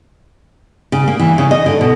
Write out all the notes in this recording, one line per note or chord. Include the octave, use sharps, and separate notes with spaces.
C#3
A#3
E3
C#3
D#5
D3
B2